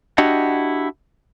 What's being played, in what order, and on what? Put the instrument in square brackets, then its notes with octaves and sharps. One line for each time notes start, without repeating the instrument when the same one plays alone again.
[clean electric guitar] D4 E4 F#4 G4 D#5 F#5